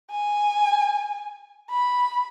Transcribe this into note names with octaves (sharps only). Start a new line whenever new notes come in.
G#5
B5